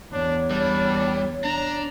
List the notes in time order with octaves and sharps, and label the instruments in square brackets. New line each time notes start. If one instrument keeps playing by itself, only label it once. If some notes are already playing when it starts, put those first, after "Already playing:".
[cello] E2 [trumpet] D4 [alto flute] C#5
[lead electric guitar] G3 [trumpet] D4
[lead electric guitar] D4 [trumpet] A#5